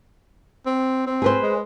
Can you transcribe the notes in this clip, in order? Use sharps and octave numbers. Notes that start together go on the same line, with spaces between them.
C4
C4
G#4 B4 C5
G#3